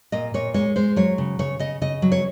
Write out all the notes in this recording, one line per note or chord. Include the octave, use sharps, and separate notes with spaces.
A#2 D#5
A#2 C#5
G#3 C#5
G#3 C5
F#3 C#5
C#3
C#3 C#5
C#3 D#5
C#3 D#5
F#3
C#5